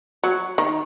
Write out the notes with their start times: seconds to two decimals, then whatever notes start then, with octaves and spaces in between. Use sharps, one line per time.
0.24 F#3
0.58 D#3